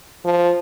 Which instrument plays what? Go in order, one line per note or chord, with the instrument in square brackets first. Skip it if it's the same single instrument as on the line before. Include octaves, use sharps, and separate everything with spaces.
[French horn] F3